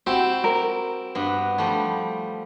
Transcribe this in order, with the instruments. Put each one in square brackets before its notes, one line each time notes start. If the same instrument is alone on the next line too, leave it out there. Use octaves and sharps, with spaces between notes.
[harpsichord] C4 E4 F#4 [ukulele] G4
[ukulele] A#4
[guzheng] G2 B3
F3 G3 A3